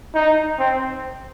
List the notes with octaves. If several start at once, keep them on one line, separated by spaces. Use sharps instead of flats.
D#4
C4